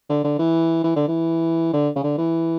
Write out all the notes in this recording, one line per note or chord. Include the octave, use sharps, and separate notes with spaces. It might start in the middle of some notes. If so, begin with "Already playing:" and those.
D3
D3
E3
E3
D3
E3
D3
C#3
D3
E3